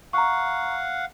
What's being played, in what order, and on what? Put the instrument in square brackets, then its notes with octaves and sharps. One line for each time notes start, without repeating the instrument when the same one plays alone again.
[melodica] F5 F#5 [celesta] A#5 C#6